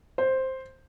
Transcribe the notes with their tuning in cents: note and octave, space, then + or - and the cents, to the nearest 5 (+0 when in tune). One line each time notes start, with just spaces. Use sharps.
C5 +5